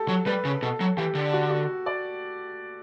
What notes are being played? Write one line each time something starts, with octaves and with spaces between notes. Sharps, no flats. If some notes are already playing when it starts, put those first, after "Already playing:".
Already playing: G4 A4
F#3
G3 B4
C#3
B2 A4
F#3
E3 G4
D3
F#4
F#4
D5